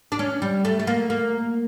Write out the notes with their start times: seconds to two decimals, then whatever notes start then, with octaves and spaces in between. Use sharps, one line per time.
0.12 D4
0.19 C#4
0.42 G3
0.65 A3
0.79 A3
0.87 A#3
1.10 A#3